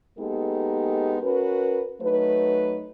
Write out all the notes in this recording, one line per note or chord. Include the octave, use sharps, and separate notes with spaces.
G#3 A#3 B3 D#4 G4 A4
C#4 F#4 A#4 B4
F#3 A3 D#4 B4